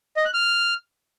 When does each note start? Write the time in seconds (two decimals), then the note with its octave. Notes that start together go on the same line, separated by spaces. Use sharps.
0.16 D#5
0.25 F#6
0.34 F6